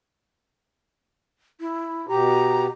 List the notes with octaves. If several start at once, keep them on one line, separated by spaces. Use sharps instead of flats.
E4
B2 G4 A#5